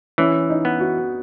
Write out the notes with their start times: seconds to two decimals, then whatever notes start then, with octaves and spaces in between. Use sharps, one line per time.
0.18 E3 C#4
0.50 D#4
0.65 B3
0.80 F#4